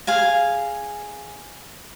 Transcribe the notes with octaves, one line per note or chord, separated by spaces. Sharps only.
G#4 F5 G#5